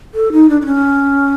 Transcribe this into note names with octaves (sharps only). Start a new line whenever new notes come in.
A4
D#4
D4
D4
C#4